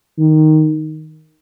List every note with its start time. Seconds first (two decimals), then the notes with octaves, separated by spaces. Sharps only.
0.18 D#3